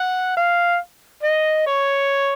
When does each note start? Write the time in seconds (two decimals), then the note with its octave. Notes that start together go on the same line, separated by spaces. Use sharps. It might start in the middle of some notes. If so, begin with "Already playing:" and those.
Already playing: F#5
0.37 F5
1.23 D#5
1.67 C#5